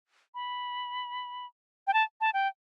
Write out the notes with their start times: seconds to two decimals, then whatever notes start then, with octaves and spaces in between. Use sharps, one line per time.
0.35 B5
1.87 G5
1.94 A5
2.21 A5
2.34 G5